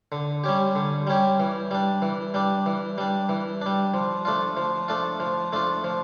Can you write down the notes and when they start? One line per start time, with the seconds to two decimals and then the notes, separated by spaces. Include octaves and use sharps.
0.12 D3
0.44 G3 C#4 G4
0.75 D3
1.07 G3 C#4 G4
1.40 E3
1.71 G3 D4
2.02 E3
2.34 G3 D4
2.66 E3
2.98 G3 D4
3.29 E3
3.62 G3 D4
3.94 F3
4.25 A3 D4 F4
4.57 F3
4.88 A3 D4 F4
5.20 F3
5.52 A3 D4 F4
5.84 F3